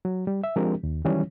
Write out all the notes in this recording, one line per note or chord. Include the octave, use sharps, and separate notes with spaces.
F#3
G3
E5
F3 G#3 C4 D4 G4 A#4
D#2
D#3 E3 F#3 G3 C#4